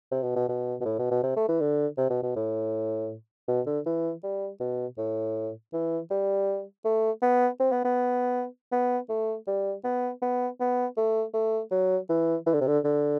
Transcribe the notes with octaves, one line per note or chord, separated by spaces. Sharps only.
C3
B2
B2
B2
B2
A2
B2
B2
C3
A3
E3
D3
C3
B2
B2
A2
B2
D3
E3
G3
B2
A2
E3
G3
A3
B3
C4
B3
B3
B3
A3
G3
B3
B3
B3
A3
A3
F#3
E3
E3
D3
C3
D3
D3